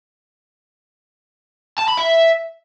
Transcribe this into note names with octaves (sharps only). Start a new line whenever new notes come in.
A5
B5
E5